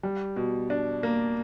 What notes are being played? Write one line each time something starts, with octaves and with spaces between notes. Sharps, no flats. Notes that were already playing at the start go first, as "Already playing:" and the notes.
G3
B2
D4
A#3